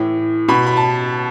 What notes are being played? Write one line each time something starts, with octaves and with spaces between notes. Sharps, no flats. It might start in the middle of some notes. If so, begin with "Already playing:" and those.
Already playing: A2 E3
B2 B5
B5
A5